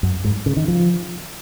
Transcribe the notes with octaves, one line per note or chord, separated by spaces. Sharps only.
F#2
G#2
C#3
D#3
F3